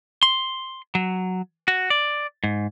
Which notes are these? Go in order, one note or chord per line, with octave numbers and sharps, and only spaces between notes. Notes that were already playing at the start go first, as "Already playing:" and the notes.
C6
F#3
F#4
D5
G#2